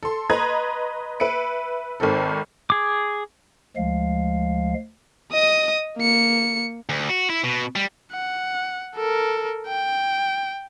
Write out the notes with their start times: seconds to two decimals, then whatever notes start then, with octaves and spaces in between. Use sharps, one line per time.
0.03 A4 C6
0.30 B4 D#5 A#5 C6 G#6
1.20 B4 E5 C#7 D7
2.00 G#1 D#3 C4 A4
2.70 G#4 D6
3.76 D2 F3 G#3 F5
5.32 D#5 D#6
5.97 A#3 C#7
6.89 D2
7.09 F#4
7.30 E4
7.44 B2
7.76 G3
8.12 F#5
8.95 A4 A#4
9.67 G5